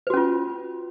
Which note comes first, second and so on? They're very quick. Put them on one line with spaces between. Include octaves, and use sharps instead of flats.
B4 F#4 C#4 F4